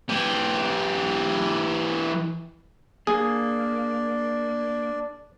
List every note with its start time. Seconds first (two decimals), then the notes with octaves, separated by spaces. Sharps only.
0.09 E3 G4
3.07 A#3 D4 G#4 D5